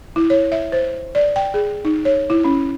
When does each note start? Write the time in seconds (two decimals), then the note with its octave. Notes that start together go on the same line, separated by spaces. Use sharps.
0.16 E4
0.30 C#5
0.52 E5
0.72 C5
1.15 D5
1.36 G5
1.54 G#4
1.85 D#4
2.05 C#5
2.30 E4
2.44 C#4